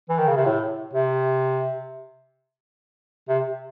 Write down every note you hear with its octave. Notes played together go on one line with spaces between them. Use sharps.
E3
D#3
C#3
C3
A2
C3
C3